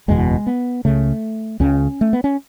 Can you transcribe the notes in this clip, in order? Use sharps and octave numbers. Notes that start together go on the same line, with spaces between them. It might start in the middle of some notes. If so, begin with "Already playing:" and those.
F#1 E2 B2 G#3
B3
C#2 C#3 A3
C#2 C#3 C#4
A3
B3
C#4